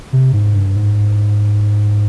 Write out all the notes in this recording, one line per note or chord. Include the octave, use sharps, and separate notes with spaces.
C3
G#2
G2
G#2